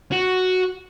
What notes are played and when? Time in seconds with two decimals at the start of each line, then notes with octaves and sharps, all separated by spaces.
0.12 F#4